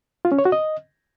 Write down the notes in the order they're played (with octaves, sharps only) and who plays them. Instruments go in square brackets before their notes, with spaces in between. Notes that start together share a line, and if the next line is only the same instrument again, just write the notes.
[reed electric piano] F4
C#4
C#5
F#4
D#5